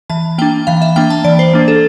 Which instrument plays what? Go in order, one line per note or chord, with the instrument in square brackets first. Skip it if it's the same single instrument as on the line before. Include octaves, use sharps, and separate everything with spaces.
[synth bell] E3 A5
A#3 D4 G5
E3 F5
E5
A#3 D4 G5
A5
E3 D5
C5
A#3 D4
A4